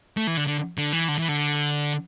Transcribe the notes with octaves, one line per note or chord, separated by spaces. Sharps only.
A3
E3
D3
D3
D3
E3
D3
E3
D3